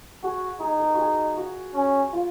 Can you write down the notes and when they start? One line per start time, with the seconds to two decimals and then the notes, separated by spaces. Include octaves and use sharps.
0.23 F#4 G#4
0.60 D#4 G#4
0.80 A#4
0.94 F#4 G#4
1.37 F#4
1.75 C#4
2.13 F4